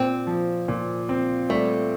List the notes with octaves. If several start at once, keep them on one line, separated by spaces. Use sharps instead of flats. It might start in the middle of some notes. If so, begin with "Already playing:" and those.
Already playing: A#2 C4
F3
A#2
C4
G3 A3